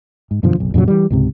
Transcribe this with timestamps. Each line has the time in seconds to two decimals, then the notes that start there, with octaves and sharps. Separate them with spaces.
0.31 G#2
0.43 F#2 B2 D3 F3
0.56 F#1 B1
0.74 F2 A#2 C#3 F#3
0.88 E3 G3
1.10 C#2 G#2 C3